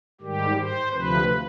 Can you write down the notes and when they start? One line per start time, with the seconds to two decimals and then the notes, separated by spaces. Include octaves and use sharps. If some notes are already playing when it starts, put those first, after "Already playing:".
0.21 G#2 D#3 G3 G4
0.56 C5
0.92 D2 C3 F3 B4